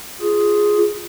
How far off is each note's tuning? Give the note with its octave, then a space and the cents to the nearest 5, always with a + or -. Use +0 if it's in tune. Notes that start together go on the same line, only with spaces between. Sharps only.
F4 +0 G#4 +0